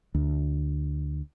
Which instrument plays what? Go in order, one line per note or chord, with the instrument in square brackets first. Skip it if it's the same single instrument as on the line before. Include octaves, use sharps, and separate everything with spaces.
[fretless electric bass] D2